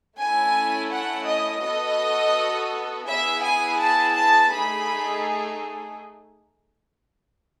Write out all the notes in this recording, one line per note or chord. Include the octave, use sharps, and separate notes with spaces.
A3 C#4 E4 G#5
F#5
D#5
B3 F#4 A4 D#5
B3 E4 G#4 E5
G#5
A5
A5
A3 D#4 G#4 B5